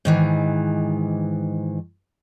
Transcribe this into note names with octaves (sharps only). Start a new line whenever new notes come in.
G#2 D#3 E3